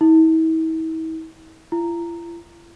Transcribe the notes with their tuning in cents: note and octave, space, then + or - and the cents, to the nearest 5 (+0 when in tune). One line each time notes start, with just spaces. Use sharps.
E4 -45
E4 +45